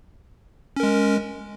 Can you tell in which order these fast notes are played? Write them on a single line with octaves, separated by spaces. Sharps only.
C#4 A#4 G#3